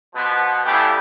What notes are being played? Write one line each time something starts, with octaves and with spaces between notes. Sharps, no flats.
B2 F3 B3
C#3 A3 B3 D4 E4 G4